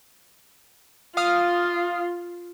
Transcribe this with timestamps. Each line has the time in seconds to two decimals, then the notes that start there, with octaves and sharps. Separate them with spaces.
1.17 F4 F5 D#6 F6